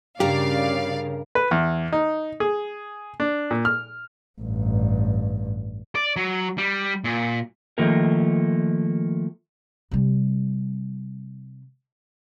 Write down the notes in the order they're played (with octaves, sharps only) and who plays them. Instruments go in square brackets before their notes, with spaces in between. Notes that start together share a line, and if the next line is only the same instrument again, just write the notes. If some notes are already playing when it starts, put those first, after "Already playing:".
[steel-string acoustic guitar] G2 A#4 [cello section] C#3 [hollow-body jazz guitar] G4 [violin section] D5 F5
[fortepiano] B4
E2
D#4
G#4
D4
A#2
F6
[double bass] A1 G2
[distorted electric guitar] D5
F#3
G3
A#2
[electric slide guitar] D#3 F3 A3 A#3 A#4
[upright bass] C3 G3